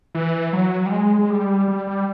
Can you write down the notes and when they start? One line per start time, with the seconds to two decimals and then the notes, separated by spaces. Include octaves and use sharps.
0.15 E3
0.53 F#3
0.86 G3
0.91 G#3
1.19 G#3
1.30 G3
1.68 G3
1.87 G3